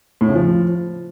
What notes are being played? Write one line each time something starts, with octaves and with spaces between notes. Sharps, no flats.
A2
C#3
F3